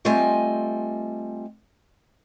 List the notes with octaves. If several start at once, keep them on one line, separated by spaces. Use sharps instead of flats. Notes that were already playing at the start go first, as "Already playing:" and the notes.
G3 A3 C4 F4 D#5 G#5